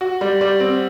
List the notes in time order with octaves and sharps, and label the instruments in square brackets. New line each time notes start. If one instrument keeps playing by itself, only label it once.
[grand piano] F#4
G3
G3
C4